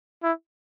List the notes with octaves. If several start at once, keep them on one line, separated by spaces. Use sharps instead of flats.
E4